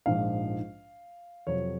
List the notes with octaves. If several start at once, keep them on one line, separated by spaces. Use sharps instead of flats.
A#1 G#2 F3 F5
F2 C3 F#3 C#5